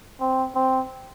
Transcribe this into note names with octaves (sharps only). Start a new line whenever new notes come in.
C4
C4